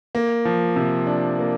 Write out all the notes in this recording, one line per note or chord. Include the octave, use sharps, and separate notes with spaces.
A#3
F3
C3
D4
A#3